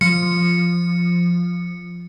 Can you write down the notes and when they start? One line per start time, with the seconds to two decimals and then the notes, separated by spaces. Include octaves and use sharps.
0.01 F3 C#7